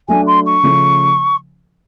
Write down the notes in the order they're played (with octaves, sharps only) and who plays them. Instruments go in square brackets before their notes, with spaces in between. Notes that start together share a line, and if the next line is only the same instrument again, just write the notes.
[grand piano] F#3 A3 D4 [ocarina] G#5
[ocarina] C6
C#6
[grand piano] C#3 F3 A3 C#4